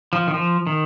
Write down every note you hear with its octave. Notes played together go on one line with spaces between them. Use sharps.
F3
D#3
F3
D#3